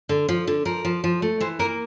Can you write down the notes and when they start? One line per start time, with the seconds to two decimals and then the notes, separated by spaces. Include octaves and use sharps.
0.09 D3
0.29 F3
0.47 D3
0.65 F3 A#4
0.85 F3
1.04 F3
1.22 A3
1.40 E3 C5
1.59 A#3 A#4